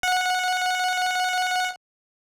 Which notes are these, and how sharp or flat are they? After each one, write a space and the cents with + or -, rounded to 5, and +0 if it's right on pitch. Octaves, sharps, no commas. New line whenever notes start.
F#5 -15